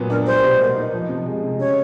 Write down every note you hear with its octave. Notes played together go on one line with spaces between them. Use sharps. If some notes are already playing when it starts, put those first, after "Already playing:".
Already playing: A#2 F#3 B3
D4 A#4
G3 C5
B2
A#3
D#4
F3
C3
G#3
C3
C#3 C#5